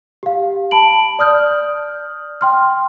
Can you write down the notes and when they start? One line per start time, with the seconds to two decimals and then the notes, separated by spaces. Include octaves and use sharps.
0.23 G4 F5
0.71 A5 B5 D7 F#7
1.19 D5 D#6 F6 G6
2.41 G5 C6 F6